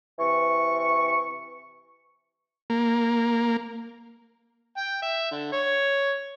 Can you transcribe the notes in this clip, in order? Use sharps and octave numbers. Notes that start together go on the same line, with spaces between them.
C3 E3 C#6
A#3
G5
E5
D3
C#5